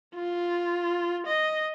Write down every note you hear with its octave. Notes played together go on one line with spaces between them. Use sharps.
F4
D#5